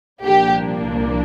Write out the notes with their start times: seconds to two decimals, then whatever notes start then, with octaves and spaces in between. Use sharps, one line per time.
0.24 C2 A#2 F3 A#3 D4 G4